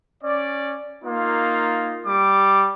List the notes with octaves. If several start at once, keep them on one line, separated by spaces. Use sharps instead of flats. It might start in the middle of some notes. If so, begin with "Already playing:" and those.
C#4 D5
A#3 D#4 F4
G3 D6